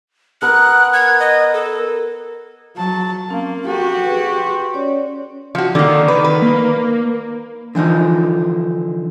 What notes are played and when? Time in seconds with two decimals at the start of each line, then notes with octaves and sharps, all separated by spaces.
0.42 B3 A#4 F#6
0.93 G#6
1.20 D#5
1.54 A4
2.77 F#3 A5
3.30 A#3 C4 C#4
3.67 F#4 G4 A4
4.04 G#4 B4
4.37 C6
4.74 C#4 C#5 D5
5.55 F3 F#4
5.75 D3 D#3 A#3
6.08 B4
6.25 B4
6.42 A#3
7.75 D3 E3 F3 D#4